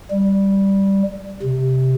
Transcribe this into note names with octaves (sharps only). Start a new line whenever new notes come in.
G3
C3